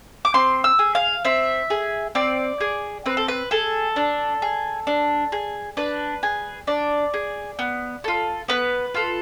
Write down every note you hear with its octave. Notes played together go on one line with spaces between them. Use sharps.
D6
C4 C6
E6
G#4
F5
C4 E5
G#4
C4 D5
G#4
C4 B4
A4
B4
G#4 A4
D4
G#4
D4
G#4
D4 B4
G#4
D4 D5
G#4
B3
F4 A4
B3 B4
F4 A4